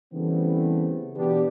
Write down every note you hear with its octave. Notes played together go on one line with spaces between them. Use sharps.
C#3 E3 G3 A3 B3 C4
B2 E3 B3 D4 G4